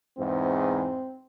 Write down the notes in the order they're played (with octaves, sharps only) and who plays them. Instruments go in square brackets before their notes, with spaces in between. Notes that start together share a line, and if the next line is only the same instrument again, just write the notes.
[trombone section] E2 G#2 [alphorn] C4